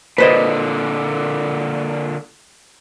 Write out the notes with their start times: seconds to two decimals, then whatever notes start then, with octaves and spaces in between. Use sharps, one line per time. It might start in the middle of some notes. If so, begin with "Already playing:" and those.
0.18 A#2 D3 B4 C5 D#5